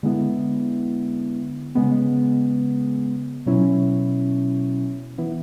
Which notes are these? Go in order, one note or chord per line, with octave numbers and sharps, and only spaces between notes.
D3 G#3 B3 E4
C#3 G#3 B3
B2 F#3 C#4 E4
E3 B3 E4